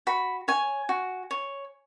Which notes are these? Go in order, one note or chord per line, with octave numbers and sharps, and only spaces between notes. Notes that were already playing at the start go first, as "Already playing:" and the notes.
F#4 B5
C#5 G#5
F#4
C#5